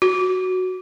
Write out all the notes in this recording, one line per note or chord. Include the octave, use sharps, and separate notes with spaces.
F#4